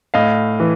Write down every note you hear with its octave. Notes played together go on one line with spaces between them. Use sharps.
A2 D#5 F5
E3